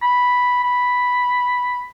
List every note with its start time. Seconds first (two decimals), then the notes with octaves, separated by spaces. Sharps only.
0.02 B5
0.64 B5